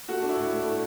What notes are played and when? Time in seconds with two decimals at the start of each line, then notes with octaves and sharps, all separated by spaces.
0.08 A3 F#4
0.22 D4
0.29 E4
0.37 A2
0.51 A2
0.65 A3